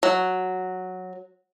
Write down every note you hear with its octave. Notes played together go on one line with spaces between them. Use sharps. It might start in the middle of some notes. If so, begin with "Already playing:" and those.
F#3